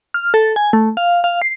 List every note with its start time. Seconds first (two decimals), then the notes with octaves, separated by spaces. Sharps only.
0.14 F6
0.34 A4
0.56 G#5
0.73 A3
0.97 F5
1.24 F5
1.42 C7